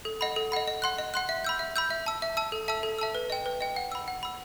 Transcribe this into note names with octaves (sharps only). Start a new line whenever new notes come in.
A4
D#5 F#5 B5
A4
D#5 F#5 B5
D#5
F#5 C6 F#6
D#5
F#5 C6 F#6
E5
B5 E6 G6
E5
B5 E6 G6
E5
A5 E6
E5
A5 E6
A4
E5 A5 E6
A4
E5 A5 E6
B4
D#5 G5
B4
D#5 G5
F#5
B5 E6
F#5
B5 E6